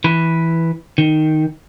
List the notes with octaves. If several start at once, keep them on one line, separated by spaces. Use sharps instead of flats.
E3 B4
D#3